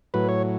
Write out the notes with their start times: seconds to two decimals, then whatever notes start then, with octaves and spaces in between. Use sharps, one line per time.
0.14 A2 F#3 B4
0.29 C#5